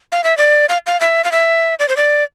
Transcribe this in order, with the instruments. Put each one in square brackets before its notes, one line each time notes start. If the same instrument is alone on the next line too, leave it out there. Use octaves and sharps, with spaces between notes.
[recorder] F5
E5
D5
F5
F5
E5
F5
E5
D5
C5
D5